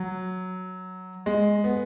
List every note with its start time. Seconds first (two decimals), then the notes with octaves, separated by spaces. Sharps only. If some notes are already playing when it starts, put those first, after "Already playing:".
Already playing: F#3
1.26 G#3
1.64 B3